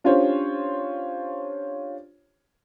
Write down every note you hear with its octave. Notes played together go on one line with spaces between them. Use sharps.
C#4 D4 F4 G4 C5 C#5